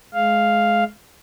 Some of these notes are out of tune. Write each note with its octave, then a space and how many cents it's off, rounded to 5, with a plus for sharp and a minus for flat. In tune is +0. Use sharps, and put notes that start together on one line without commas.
G#3 +25 F5 +0